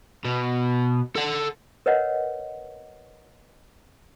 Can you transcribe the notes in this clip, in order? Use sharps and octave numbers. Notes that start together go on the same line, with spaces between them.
B2
A4 F#5
A#4 B4 C#5 D#5 F#5